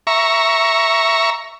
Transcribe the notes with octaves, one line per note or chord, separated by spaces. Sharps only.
E5 A#5 C#6